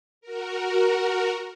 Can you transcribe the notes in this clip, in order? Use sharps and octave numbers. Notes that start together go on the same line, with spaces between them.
F#4 A#4